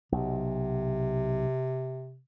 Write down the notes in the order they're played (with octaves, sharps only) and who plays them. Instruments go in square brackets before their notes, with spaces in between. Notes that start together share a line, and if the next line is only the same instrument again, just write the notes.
[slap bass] B1 [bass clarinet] C3